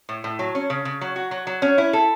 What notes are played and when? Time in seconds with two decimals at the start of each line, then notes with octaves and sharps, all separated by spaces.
0.09 A2
0.24 A2
0.39 F#3
0.55 C#4
0.70 C#3
0.85 C#3
1.01 F#3
1.16 F#4
1.31 F#3
1.47 F#3
1.62 C#4
1.78 E4
1.93 A4